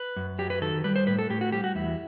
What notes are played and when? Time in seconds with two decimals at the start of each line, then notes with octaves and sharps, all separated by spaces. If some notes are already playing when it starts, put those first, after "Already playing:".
Already playing: B4
0.16 F#2
0.38 F#3 G4
0.50 B4
0.61 D#3 A4
0.84 G3 B4
0.96 C5
1.07 A2 B4
1.19 A4
1.30 A2 G4
1.41 F#4
1.52 G3 G4
1.64 F#4
1.75 E2 E4